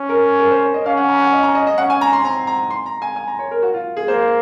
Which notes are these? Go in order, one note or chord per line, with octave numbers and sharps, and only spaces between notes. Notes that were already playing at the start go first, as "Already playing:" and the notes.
Already playing: C#4
A#4
A#4
C5
C#5
D#5
C#4 F5
F#5
A#5
F#5
D#5
A#5
D#5
D#5
C#4 F#5
G#5
A#5
C6
C4 A#5
A#5
C6
A#5
G#5
G#5
A#5
C#5
A#4
F#4
F4
G#4
A#3 C5